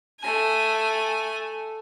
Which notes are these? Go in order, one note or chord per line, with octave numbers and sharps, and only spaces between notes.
A3 G#5